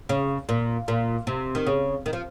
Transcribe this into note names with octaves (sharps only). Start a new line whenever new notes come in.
C#3
A#2
A#2
C3
D#3
C#3
D#3
F3